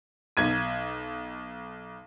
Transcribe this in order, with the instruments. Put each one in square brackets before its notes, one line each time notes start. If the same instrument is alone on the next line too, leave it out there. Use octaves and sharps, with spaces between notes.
[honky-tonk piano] B1 G#6 D#7